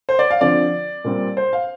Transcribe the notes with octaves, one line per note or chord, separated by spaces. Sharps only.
C5
D5
F5
D3 F3 C4 D5
A#2 G3 C4
C5
F5